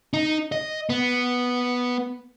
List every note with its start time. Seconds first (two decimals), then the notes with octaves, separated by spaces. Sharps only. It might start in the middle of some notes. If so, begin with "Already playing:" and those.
0.13 D#4
0.52 D#5
0.90 B3